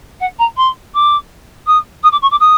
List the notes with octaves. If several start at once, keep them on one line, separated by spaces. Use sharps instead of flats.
F#5
A#5
C6
D6
D#6
D#6
D6
C#6
D6
D#6